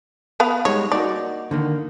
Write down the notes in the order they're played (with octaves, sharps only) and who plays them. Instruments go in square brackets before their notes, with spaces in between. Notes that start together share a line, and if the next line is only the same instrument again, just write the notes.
[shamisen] B3 B4 F5
[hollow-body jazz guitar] G3 G#3 D#4 [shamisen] C#5
[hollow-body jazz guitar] A#3 D#4 F#4 [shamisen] D5
[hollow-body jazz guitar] D3 D#3 A#3